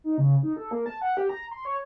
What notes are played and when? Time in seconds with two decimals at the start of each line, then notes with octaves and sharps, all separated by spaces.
0.04 D#4
0.18 C#3
0.43 D#4
0.56 A4
0.71 A#3
0.86 A5
1.01 F#5
1.17 G4
1.29 A#5
1.51 C6
1.65 C#5